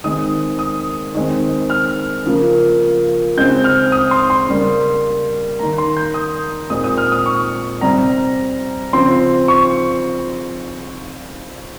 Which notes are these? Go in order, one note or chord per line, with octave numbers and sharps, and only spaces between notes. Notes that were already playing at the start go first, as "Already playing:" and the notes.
D#3 G#3 C4 D#6
D#6
D#3 G#3 C4
F6
C#3 F3 A#3
C#3 G#3 C4 G6
F6
D#6
C6
C6
C#3 G3 A#3
D#3 A#3 A#5
C6
G6
D#6
A#2 G#3 C4 D#6
D#6
F6
D#6
C#6
C3 G3 C4 A#5
C#3 F3 C4 C6
C#6